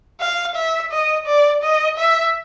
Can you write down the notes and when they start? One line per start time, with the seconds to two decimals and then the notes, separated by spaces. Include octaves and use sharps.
0.20 F5
0.55 E5
0.91 D#5
1.26 D5
1.63 D#5
1.97 E5